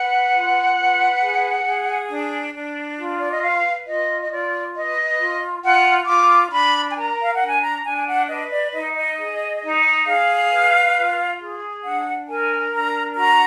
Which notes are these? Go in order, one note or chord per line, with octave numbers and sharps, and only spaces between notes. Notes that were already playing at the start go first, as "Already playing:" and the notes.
Already playing: B4 F#5
F4
B4
G#4
G#4
D4
D4
F4
D5
D#5
B4 F5
F4 D#5
D#5
F4 D5
B4 D#5
F4
F4 F#5
F4 D6
D4 B5
G#5
A#4 A#5
F5
F#5
D4
G#5
A#5
D4 G#5
G#5
F#5
B4 D#5
D5
D#4 D#5
D#5
G#4
D#4
G#4 F5
B4
F4
G#4
D4 F#5
A#4 G#5
D4 A#5
F#4 A#5